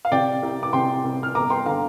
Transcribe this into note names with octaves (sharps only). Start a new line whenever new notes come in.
F5
C3 D5 G5
C2
D6
C3 G5 C6
C2
F6
G1 A#5 D6
G5 C6
D3 F5 A#5